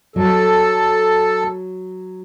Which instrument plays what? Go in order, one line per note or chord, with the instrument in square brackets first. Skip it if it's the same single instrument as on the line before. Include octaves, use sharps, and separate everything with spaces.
[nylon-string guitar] F#3 [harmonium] A4